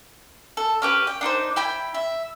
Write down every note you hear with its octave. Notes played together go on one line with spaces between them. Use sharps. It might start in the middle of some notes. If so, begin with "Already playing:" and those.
A4
C#4 G4 B4
G5
D4 D#4 A#4 C5
E4 G5 B5
E5